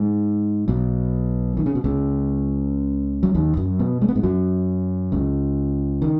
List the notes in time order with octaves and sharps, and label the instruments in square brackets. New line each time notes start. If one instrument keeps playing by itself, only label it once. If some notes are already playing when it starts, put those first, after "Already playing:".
Already playing: [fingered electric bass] G#2
B1 B2
D#3
C#3
B2
C#2 C#3
F#3
D#2 D#3
F#2 F#3
B2 B3
G#3
B3
G#2 G#3
F#2 F#3
C#2 C#3
D#3